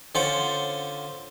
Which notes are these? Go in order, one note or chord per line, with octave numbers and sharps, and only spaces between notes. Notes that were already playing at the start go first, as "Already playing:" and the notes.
D3 C#4 F4 C5 F#5 A5